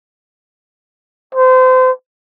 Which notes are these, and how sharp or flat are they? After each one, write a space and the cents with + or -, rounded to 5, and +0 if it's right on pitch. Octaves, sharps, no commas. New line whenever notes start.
C5 -30